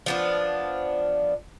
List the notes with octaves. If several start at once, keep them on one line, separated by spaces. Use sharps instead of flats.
F3 B3 D4